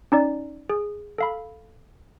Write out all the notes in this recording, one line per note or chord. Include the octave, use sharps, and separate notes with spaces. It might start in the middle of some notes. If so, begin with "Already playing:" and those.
C#4 D#4 D5
G#4
A4 F5 B5